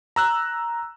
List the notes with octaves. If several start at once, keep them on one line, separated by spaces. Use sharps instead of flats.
A#5 E6 F#6